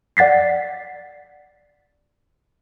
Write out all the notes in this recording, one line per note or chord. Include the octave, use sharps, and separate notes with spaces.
D5 F#5 A6 B6 C7